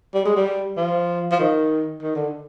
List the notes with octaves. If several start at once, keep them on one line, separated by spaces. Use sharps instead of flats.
G3
G#3
G3
F3
F3
D#3
D#3
D3